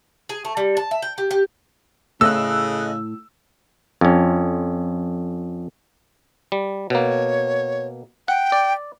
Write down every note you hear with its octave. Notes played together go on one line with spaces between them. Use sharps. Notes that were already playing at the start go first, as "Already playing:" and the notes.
G#4
A3
G3
A5
E5
G5
G4
G4
A2 C#3 A4 D#5 E6 F#6
F2 C#4
G3
B2 A#3 C#5
F#5 G5
D5